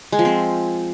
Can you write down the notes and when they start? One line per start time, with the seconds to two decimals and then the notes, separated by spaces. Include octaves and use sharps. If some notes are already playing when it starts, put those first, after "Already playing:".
0.12 G#3
0.19 F3
0.25 C4